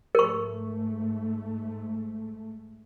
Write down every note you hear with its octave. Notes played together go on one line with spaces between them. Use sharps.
G#2 A3 A#4 C#6